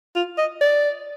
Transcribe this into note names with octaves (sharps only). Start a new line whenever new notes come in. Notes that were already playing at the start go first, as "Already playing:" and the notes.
F4
D#5
D5